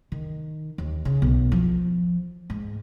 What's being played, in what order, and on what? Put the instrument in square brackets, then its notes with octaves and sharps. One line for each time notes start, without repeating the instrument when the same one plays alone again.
[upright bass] D#3
D#2
C#3
B1
F3
G#2